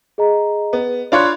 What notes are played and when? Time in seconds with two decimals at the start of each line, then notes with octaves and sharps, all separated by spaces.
0.18 G#4 D#5 A#5
0.73 B3
1.12 D4 F4 C#5 B5 C6 F#6